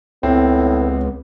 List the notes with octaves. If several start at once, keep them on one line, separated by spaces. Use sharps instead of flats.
C#2 A2 B3 C4